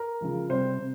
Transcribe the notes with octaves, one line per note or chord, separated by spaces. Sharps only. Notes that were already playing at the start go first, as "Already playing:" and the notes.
Already playing: A#4
C#3 F3 G#3
C3 G3 C5
C3